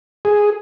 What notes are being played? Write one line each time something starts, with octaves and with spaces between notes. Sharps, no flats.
G#4